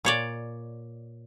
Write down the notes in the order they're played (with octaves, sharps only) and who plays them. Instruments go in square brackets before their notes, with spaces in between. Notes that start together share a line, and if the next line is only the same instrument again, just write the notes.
[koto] A#2 C#5 D5